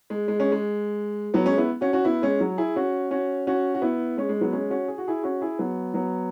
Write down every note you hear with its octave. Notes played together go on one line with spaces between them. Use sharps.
G#3
G#3
G#3 C#4
G#3
F#3 B3
G#3 C#4
B3 E4
C#4 F#4
C#4 F#4
B3 E4
G#3 C#4
F#3
E4 G#4
C#4 F#4
C#4 F#4
C#4 F#4
F#4
B3 E4
G#3 C#4
G#3
F#3 B3
G#3 C#4
C#4 F#4
G#4
F#4
E4 G#4
C#4 F#4
E4 G#4
F#3 B3
F#3 B3